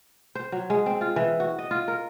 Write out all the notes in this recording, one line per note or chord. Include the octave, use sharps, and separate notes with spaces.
C5
F#3
G#3
C4
F4
E3
F#4
D#5
F4
A#4